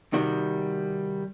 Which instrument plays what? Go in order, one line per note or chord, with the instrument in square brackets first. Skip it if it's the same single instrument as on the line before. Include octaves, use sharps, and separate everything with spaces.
[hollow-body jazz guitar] C3 D#3 G3 F#4